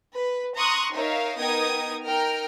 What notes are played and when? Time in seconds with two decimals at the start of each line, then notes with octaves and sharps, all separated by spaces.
0.15 B4
0.57 A#5 C6 C#6 D#6 F#6
0.94 D#4 A#4 C#5 E5 F5
1.37 B3 D#4 A#4 G5 D#6 G#6
2.05 D#4 A#4 G5 F6